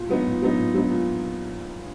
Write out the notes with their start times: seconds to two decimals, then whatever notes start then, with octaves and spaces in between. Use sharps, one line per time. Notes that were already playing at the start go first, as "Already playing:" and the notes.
Already playing: A#2
0.09 F#3 B3 D#4
0.26 A#2
0.42 F#3 B3 D#4
0.58 A#2
0.74 F#3 B3 D#4
0.90 A#2